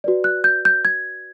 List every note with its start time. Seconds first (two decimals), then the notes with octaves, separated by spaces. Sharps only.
0.04 F#4 B4 D5
0.24 F#6
0.44 G6
0.65 G6
0.85 G#6